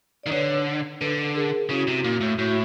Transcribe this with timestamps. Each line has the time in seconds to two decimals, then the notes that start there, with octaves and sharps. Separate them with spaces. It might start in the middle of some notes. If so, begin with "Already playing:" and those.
0.23 D#3 D5
0.31 D3 B4 C#5
1.01 D3 A4 B4
1.35 G#4 A#4
1.70 C#3 E4 F#4
1.87 C3
2.04 A#2
2.21 A2
2.39 A2 E4 F#4